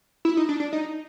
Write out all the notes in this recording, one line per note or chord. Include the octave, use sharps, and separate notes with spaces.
E4
D#4
D4
D4
D#4